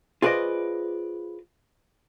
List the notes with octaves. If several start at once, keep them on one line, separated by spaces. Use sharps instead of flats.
F4 G#4 B4 C5 D5 D#5